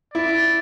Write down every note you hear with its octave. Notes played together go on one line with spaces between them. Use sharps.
E4 D5